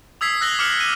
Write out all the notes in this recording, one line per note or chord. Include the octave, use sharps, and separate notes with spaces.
D#6 E6 G#6 B6 C7
E6 F#6 A#6 F#7 G7
D6 F6 C#7 F#7
D#7